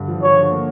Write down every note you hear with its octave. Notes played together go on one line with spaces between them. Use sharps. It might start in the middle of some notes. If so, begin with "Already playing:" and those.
Already playing: G2 D3
F3
F3 C#5
D3
A#3